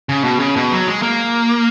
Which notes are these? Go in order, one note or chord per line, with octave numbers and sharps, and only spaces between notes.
C#3
B2
C#3
B2
F#3
G#3
A#3